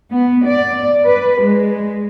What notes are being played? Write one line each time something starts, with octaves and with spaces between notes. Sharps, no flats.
B3
D5
B4
G#3